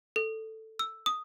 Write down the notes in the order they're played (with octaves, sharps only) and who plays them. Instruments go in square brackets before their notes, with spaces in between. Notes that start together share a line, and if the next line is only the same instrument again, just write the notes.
[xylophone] A4
E6
D#6